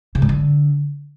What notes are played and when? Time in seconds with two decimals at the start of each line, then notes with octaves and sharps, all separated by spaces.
0.15 C#3
0.22 G#2
0.29 D3